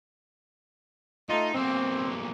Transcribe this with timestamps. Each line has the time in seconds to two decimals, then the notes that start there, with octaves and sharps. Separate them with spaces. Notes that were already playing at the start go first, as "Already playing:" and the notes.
1.29 A3 D#4 F4 D#5
1.55 B1 A#3 C4